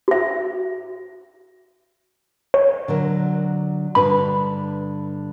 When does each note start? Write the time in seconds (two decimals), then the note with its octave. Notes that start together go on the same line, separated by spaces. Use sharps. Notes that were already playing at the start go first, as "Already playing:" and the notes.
0.08 F#4 E5
2.54 C#5
2.88 D3 F#3 A#4
3.95 G2 D3 B4 B5